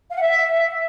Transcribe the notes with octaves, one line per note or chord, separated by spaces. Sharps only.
F5
F#5
E5